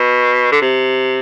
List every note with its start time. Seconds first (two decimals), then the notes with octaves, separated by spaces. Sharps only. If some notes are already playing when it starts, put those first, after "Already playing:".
Already playing: B2
0.52 D3
0.62 C3